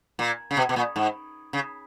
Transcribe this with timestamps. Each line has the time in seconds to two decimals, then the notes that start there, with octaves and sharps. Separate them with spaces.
0.19 A#2
0.51 C#3
0.57 B2
0.69 B2
0.76 A#2
0.96 G#2
1.53 C#3